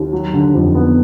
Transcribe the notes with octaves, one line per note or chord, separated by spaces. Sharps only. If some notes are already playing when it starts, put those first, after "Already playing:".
Already playing: D#2
F#3
D3
F2
B3